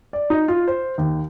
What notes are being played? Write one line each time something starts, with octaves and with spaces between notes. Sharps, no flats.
D5
D#4
F4
C5
D#2